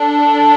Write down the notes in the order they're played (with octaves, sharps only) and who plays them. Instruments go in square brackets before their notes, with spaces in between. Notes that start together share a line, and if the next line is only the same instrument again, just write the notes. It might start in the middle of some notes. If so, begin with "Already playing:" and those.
Already playing: [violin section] D4 A4